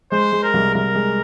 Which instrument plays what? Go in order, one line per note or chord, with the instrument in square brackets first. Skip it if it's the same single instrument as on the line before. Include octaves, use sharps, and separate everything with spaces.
[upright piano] G#3 [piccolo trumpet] C5
[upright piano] G#3
[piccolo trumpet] A#4
[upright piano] C2
[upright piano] C2 [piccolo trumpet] A#4
[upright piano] G#3